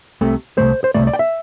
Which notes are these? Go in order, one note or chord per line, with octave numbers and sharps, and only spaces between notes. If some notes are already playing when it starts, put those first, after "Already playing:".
C2 C3 A3
C2 C3 A3 C5
C5
C2 C3 A3 D5
D5
G5
E5